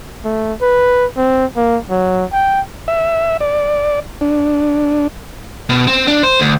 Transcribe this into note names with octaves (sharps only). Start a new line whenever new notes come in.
A3
B4
C4
A#3
F#3
G5
E5
D5
D4
B2
C4
D4
C5
D2